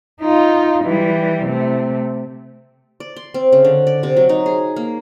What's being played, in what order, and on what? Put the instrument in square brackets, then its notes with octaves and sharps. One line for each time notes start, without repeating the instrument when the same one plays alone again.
[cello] D#4 F4
E3 G3
C3 A3
[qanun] D5
C6
C4
C#3
D3
D5
C3
F#3
D#4
G#4
A#3